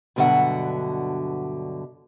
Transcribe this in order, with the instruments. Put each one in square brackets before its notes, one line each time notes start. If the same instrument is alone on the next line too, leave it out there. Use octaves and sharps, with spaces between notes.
[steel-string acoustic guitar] G2 B2 D3 F#3 E5 F#5